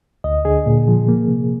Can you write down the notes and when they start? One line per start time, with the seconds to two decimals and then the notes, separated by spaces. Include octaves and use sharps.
0.24 D2 D#5
0.45 D3 G#4
0.66 A#2
0.88 F3
1.08 A#3
1.28 C3